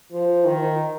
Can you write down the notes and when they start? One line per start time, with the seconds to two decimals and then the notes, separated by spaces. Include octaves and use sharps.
0.12 F3
0.46 D#3